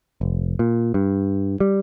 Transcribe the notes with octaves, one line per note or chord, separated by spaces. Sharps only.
F1
A#2
G2
G3